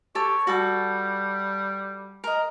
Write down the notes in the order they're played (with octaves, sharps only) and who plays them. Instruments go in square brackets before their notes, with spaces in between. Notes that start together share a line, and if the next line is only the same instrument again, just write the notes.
[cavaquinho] G4 A4 [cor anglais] C#5
[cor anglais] G3 [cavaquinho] F#4 A4 A5
[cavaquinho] A#4 D#5